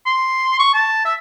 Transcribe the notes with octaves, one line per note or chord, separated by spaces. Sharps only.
C6
C#6
A5
E5